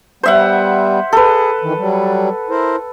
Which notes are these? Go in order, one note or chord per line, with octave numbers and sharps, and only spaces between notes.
G3 B3 C5 E5 F#5
G#4 A4 B4
D#3 E3
F#3 G3
E4 A#4 C5